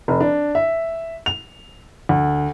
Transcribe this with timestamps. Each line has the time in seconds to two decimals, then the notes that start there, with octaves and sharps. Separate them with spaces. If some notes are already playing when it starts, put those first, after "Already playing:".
0.08 F1
0.21 D4
0.55 E5
1.26 F7
2.09 D2